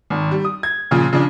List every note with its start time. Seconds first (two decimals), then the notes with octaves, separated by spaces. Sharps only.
0.10 G#1
0.31 G3
0.45 D#6
0.63 G#6
0.91 A#2 C#3 F3
1.13 C#3 F3 D4